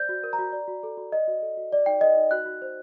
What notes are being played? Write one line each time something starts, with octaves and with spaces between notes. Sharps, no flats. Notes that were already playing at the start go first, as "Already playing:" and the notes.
Already playing: C5 D5 G6
F#4
A#4
A#5
F#4
D5
F#4
A4
F#4
D5 D#5
F#4
A4
F#4
D5
D#4 G5
A4 D#5
D#4
F#4 F#6
F#4
C5